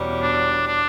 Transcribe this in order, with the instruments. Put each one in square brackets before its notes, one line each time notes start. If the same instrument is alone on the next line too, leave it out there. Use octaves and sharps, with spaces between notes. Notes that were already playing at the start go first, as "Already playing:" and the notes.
Already playing: [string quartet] E2 B2 G3 C#4
[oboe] D4
D4